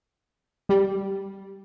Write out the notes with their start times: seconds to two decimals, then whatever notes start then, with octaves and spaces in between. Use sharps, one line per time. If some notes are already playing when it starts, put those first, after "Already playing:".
0.69 G3